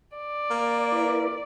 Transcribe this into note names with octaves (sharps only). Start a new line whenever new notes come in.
D5
A#3
E4 A#4 B4